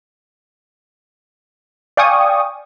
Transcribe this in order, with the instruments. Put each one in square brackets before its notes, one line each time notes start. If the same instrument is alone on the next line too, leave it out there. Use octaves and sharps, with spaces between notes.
[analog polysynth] D5 F5 G5 G#5 C#6 D#6